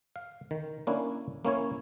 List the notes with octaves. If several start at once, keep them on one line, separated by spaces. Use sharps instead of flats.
F5
D#3
A#3 C#4 D4 E4
A#3 C#4 E4 C#5